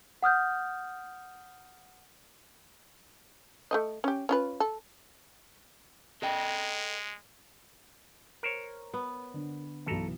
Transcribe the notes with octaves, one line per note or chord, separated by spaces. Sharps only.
F#5 D#6 F6 G6
A3 C4 D#5
C#4 G4
C#4 F4 B4
A4
G#3 A4 D#5 G5
A#4 C5 C#5
B3
D3
B1 B2 E3 A4 A#5